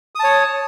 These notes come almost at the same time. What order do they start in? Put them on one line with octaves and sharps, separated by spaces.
D#6 A5 C#5